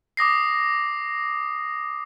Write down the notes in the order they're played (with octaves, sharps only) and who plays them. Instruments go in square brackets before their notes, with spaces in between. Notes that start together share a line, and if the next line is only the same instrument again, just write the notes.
[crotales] D6 D#6 A#6 C7